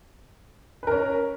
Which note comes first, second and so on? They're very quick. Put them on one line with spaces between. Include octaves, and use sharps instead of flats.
B4 A#4 C#4